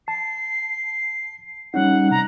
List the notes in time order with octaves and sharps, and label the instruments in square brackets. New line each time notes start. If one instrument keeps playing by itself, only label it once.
[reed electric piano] A5 [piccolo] C7
[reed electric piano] G3 C#4 D#4 [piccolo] F#5
[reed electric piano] C3 [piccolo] A#5